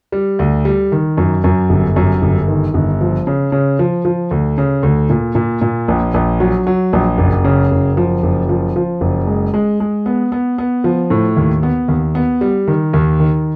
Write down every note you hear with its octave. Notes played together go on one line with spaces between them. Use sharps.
G3
D2
G3
D#3
F#2
F#2
G1
F#2
G1
D#3
G1
F3
C#3
C#3
F3
F3
D2
C#3
D2
A#2
A#2
A#2
A#1
A#1
F#3
F#3
A#1
F#1
C#3
F#1
F3
F#1
F3
F3
F#1
G#3
G#3
G#3
B3
B3
B3
F3
A2
D#2
B3
D#2
B3
G3
D#3
D#2
D#3